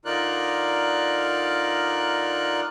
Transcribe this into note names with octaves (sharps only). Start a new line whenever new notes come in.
D3 D#4 F4 A#4 D5 F#6